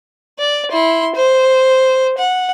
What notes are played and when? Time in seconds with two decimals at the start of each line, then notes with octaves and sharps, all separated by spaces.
0.39 D5
0.72 E4 C6
1.15 C5
2.18 F#5